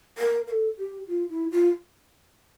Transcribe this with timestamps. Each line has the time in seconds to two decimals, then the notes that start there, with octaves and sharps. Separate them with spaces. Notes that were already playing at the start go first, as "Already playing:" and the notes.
0.18 A#4
0.47 A#4
0.51 A4
0.78 G4
1.07 F4
1.30 E4
1.51 F4